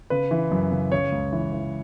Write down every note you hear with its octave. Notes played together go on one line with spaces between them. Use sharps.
C#3 B4
E3
F#2
C#3
C#3 C#5
C#2
E3
E3